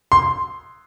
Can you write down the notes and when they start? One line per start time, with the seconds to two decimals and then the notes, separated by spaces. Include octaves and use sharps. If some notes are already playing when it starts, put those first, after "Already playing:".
0.12 C6